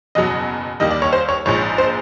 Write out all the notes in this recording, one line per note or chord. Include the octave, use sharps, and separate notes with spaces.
F#1 E2 B2 F#3 D#5
D#2 D#3 G3 D#5
D5
C#5
C5
C#5
A#1 G#2 F3 C#5
C5